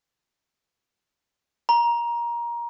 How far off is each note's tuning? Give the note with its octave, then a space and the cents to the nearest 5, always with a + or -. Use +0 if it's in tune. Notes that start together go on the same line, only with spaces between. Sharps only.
A#5 +20